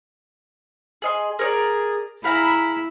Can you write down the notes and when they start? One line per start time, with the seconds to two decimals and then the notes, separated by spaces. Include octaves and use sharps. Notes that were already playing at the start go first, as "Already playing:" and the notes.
1.02 G#4 D#5 C6
1.39 G#4 A#4 C#5 D5
2.24 E4 G#4 F5 A#5 B5